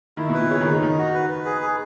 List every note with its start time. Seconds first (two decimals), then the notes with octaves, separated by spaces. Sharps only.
0.17 D#3 E4
0.29 B2
0.34 A#2 B4
0.50 C#3 C#5
0.61 D#3
0.66 D#4
0.71 C#3
0.82 D#3 D#4
0.98 F#4
1.14 B4
1.30 B4
1.45 G#4
1.61 G#4